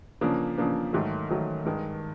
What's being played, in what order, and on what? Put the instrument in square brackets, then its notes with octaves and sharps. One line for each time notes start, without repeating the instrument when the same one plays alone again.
[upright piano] C#3 F3 A#3 D4
C#3 F3 A#3 D4
G#2 D#3 F#3 A3
G#2 D#3 F#3 A3
G2 D#3 G#3